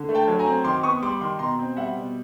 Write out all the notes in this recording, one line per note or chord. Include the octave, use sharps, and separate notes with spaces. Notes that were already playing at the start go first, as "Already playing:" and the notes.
Already playing: D3
A3
G5 A5
F#3
G#5 A#5
C4
D#3 C6 D6
B3 C#6 D#6
G3 C6 D6
D#3 C6 D6
B2 A#5 C6
C4
G3 E5 F#5
B2